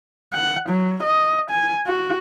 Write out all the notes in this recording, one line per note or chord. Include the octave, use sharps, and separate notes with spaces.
F#5
F#3
D#5
G#5
F#4